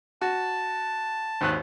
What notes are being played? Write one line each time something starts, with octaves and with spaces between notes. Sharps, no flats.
F#4 A5
G#1 D#2 F#6